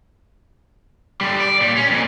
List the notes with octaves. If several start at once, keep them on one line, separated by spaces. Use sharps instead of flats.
D3 G3
D5
A#2 G3
C#4
F2 A#2